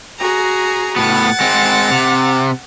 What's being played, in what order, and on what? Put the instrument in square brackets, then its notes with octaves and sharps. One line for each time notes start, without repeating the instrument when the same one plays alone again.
[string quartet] F#4 G#4 A#5
[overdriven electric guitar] A2 B3 [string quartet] F#5 A6
[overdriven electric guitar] G#3 C4
C3